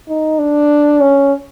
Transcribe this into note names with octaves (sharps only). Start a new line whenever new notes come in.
D#4
D4
C#4